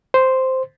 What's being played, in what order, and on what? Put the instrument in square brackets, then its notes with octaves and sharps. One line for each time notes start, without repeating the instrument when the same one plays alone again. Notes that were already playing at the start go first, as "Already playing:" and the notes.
[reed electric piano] C5